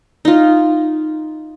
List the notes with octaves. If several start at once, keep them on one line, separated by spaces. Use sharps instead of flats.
D#4 F4